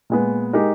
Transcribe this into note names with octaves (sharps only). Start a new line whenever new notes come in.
A#2 G#3 B3
G#3 D#4 G4 A#4